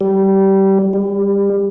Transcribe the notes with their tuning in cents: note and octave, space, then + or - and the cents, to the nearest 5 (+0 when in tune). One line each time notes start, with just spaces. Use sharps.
G3 -20
G3 +25